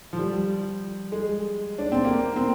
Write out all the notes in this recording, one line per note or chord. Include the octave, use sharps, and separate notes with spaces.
F3
G3
G#3
D4
C4
A#3
C4